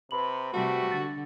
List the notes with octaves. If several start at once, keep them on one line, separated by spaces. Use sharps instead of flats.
C3 B4 B5 F#7
C3 G3 A3 F#4
D3 A6